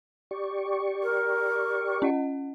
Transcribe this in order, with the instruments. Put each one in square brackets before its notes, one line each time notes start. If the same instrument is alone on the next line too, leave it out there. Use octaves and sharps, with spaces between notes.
[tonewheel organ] G4 D5 C#6
[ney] A#4
[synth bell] C#4 D#5 F#5